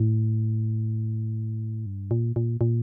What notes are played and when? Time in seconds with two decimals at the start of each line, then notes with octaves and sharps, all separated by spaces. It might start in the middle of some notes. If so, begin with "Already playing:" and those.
Already playing: A2
1.86 G2
2.11 A#2
2.36 A#2
2.61 A#2